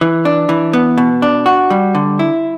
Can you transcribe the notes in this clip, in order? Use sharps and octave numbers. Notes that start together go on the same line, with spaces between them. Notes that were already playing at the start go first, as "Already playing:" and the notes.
E3
D4
E3
B3
B2
D4
F#4
G3
D3
E4